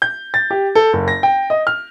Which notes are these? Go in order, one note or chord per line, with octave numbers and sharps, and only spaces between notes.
G6
A6
G4
A4
F#1
A#6
G5
D#5
F6